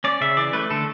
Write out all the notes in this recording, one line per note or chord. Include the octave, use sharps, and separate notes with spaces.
C#4 D5
C#3 E5
E3 D5
A3 B4
D3 A4